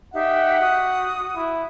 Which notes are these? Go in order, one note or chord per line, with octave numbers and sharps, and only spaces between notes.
D#4 G4 E5 F#5
F#4 D#6
E4